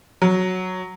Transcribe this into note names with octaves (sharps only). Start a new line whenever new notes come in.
F#3